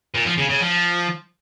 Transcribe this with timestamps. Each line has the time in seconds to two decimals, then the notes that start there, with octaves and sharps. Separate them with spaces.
0.15 A#2
0.26 F3
0.38 C#3
0.49 C#3
0.61 F3